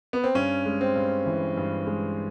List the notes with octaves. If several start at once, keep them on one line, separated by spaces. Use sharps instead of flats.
B3
C4
G2 C#4
G#3
C4
G2
E3
G2
G#3